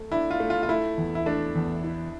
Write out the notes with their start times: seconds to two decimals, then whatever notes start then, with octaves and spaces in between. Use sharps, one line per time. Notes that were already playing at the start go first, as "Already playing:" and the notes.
Already playing: A3
0.12 D4 E4
0.31 F4
0.40 A3
0.50 F4
0.63 F4
0.69 A3 E4
0.98 E2
1.15 E4
1.26 A3 D4
1.55 E2
1.84 E4